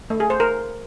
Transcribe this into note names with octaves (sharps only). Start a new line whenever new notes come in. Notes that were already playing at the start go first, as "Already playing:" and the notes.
A3
G#4
C5
A#4